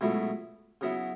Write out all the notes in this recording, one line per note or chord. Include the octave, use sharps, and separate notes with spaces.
C#2 B2 F#3 A3 E4
C#3 F#3 B3 E4